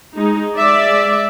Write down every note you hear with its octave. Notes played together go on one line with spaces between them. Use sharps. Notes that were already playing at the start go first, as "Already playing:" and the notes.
G#3 D#4
G#3 D5 E5